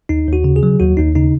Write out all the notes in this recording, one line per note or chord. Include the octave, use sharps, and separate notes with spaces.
D#2 D#4
D#2
F#4
C#3
G#4
F#3
D#2 F#4
D#2 D#4
C#3 D#4